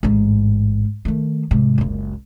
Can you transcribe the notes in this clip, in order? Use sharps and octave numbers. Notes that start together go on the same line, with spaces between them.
A1 G#2
D#3 A3
G#2 C3
F#1 C#2